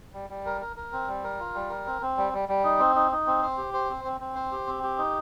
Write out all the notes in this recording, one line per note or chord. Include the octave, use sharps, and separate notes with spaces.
G3
G3
A#4
A#4
A#4
C4
G3
A#4
F4
G3
A#4
C4
C4
G3
G3
G3
D#4
C4
D#4
D#4
C4
C5
G4
C5
C4
C4
C4
C5
G4
C4
G4
D#4